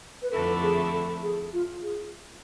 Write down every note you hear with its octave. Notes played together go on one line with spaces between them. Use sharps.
B4
F2 D3 A3 E4 A4
G#4
A4
G#4
F4
G#4